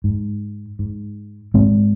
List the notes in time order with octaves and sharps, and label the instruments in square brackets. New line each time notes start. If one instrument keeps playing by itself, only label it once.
[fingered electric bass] G#2
G#2
G#2 G#3 C4